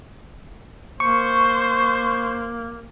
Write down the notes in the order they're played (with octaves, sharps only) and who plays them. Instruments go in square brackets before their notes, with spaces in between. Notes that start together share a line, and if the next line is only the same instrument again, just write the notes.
[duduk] A#3 [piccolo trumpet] C5 [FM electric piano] C#6